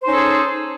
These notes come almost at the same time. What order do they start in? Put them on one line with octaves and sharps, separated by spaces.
C5 D#4 C#4 A4 G#4